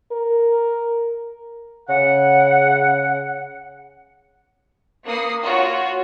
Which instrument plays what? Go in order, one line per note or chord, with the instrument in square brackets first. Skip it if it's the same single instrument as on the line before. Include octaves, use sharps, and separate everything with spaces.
[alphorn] A#4
[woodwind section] C#3 F#5
[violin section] A#3 B4 D#6 C7 C#7
F4 F#4 C#5